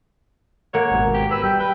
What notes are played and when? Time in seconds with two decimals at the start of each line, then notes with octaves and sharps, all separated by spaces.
0.74 A#3 C#5 F#5
0.92 G#1 G#2 B2
1.14 G4
1.31 B4 E6
1.44 G3 G5
1.60 B4 G5